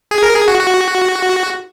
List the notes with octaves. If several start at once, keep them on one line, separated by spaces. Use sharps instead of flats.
G#4
A#4
G#4
F#4
F#4